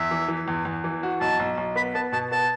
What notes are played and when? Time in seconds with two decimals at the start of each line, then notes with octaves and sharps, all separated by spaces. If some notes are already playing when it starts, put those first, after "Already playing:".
Already playing: E2 E5
0.11 E3
0.28 E3
0.48 E2
0.65 E2
0.84 E3
1.03 F#4
1.21 B1 A5
1.40 B1
1.57 B1
1.76 B3 B5
1.95 B3 A5
2.12 B2 A5
2.32 B3 A5